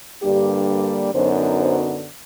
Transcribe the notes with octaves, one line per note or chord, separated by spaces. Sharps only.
G2 D3 G3 A#3 D4 G4
F#2 D3 F#3 B3 D#4 C5
C5